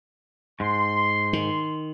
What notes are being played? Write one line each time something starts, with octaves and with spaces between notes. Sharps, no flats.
G#2 C6
D#3